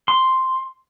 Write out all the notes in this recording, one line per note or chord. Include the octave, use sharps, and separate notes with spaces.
C6